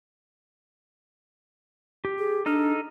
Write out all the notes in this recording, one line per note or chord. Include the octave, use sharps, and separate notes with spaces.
G4
G#4
D4 D#4 A4 F6